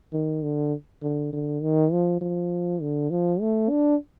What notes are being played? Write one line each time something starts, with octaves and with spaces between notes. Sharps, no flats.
D#3
D3
D3
D3
D#3
F3
F3
D3
F3
A3
D4